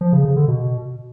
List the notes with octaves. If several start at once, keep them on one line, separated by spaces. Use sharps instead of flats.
F3
C#3
C#3
D3
B2